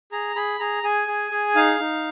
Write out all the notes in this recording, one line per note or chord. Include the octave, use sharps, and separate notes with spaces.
G#4 A#5
G#4 B5
G#4 A#5
G#4 G#5
G#4
G#4
D#4 F5
D#4